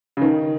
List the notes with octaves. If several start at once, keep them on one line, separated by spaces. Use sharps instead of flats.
C#3
D#3